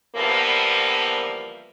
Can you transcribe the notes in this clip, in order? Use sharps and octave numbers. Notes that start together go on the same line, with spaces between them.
D3 E3 F3 G3 A#3 B3